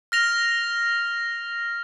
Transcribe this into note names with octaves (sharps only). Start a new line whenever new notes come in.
F6 A#6 F7